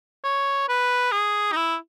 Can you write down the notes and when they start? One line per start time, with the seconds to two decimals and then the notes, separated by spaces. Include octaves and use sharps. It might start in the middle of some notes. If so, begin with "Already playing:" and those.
0.24 C#5
0.69 B4
1.12 G#4
1.52 D#4
1.56 E4